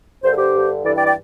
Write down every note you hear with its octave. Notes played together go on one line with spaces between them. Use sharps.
G2 D3 C5
A4
G4 C5
G2 D3
G2 E3 A4 D5
D5 G5
D5 G5